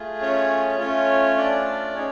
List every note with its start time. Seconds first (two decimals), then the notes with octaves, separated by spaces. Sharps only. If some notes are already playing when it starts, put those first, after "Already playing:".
Already playing: A3 F4 G#4
0.21 C#4 C#5
0.79 A3 C#4 F4 C#5
1.37 D4 D5
1.94 C#4 D#4 G#4 C#5